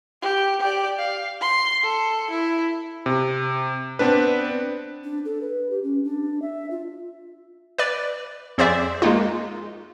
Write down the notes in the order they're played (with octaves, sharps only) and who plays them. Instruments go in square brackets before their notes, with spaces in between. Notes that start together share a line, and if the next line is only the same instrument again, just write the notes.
[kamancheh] G4
G4 D5
F5
C6
A4
E4
[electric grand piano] C3
B3 C4 D4 B4
[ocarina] D4
A4
B4
G4
C#4
D4
E5
F4
[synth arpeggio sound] B4 D5
F2 G#4 C5 D5 E5
G#3 A#3 D#4 F4